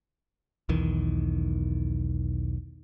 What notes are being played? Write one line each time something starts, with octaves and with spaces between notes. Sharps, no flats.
B1 E2 D#3 E3